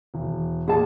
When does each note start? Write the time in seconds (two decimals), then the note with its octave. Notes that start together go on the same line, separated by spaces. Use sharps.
0.14 E1
0.68 A#2 G#4 A5